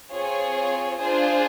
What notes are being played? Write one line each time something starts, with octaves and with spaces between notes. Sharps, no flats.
C4 F4 G#4 C#5
D4 F4 G#4 C5